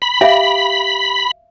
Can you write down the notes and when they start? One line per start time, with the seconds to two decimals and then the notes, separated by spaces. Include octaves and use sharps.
0.02 B5
0.21 G4 E5 F5